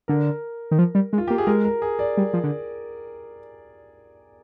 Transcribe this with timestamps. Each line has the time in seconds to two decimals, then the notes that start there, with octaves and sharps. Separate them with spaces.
0.08 D3 A#4
0.71 D#3
0.79 F3
0.95 G3
1.13 G#3
1.18 F4
1.28 A#3 G4
1.38 G#4
1.47 G#3 A#4
1.65 A#4
1.82 G#4
1.99 D5
2.17 G3
2.33 F3
2.44 D3